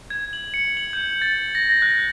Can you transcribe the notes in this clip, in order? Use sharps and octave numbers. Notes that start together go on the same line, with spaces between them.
G#6
F#7
C#7
F#7
G6
A6
A#6
A#6
F#6